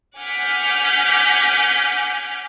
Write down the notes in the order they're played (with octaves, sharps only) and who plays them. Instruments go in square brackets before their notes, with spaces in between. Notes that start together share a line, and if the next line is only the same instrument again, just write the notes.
[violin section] F#5 G#5 D6 F6 G6 B6